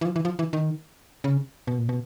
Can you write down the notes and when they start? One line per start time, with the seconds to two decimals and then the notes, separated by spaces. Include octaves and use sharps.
0.01 E3
0.05 F3
0.16 E3
0.25 F3
0.39 E3
0.53 D#3
1.24 C#3
1.67 B2
1.78 A#2
1.89 B2